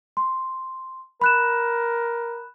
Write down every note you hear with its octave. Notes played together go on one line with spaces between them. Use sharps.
C6
A#4 B5 F#6 E7